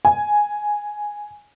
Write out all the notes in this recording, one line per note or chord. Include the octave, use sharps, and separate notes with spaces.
G#5